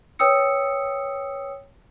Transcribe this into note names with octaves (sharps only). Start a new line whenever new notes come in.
B4 C#5 G5 D#6 E6 C#7